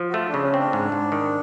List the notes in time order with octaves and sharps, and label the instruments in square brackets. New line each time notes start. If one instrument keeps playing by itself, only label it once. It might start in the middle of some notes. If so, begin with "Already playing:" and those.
Already playing: [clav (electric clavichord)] F3
[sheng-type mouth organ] F#4
[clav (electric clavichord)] A3 [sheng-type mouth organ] F4
[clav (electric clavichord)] C#3 [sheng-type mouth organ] D4
[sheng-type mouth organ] C#4
[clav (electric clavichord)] C4
[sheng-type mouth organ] D4
[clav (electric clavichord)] G#2
G#2
D#3